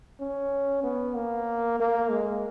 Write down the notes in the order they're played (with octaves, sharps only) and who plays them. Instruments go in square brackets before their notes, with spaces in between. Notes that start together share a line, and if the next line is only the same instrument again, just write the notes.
[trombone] C#4
B3
A#3
A#3
G#3